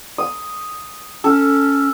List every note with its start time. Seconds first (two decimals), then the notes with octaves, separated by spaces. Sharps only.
0.18 D#6
1.24 C#4 A4